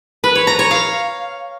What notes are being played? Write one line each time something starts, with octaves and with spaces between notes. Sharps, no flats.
B4
C#5
A#5
C#5
F5